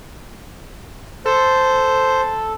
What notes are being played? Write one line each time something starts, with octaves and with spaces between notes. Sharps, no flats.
A4 C5